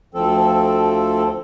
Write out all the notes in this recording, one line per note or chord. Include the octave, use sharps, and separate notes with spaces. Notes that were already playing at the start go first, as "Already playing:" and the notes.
D2 F3 C4 A4